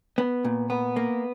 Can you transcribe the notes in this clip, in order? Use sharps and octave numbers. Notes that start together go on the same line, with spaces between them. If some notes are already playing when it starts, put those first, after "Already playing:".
B3
A#2
B3
A#3